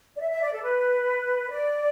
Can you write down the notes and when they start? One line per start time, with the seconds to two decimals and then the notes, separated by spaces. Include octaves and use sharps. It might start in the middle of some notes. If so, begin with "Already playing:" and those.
0.16 D5
0.20 E5
0.31 E5
0.41 D5
0.52 A4
0.63 B4
1.51 D5